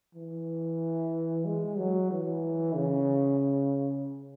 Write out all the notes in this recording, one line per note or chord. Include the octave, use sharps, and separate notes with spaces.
E3
G#3
F#3
E3
C#3